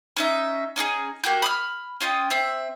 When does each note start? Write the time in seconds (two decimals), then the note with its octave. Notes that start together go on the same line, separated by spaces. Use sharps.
0.17 C#4 D#4 E5
0.76 C#4 D#4 E4 G#4
1.24 A#3 F#4 G4 G6
1.42 B5 D#6 F6
2.01 C#4 F4 D#5 G5
2.30 C4 E5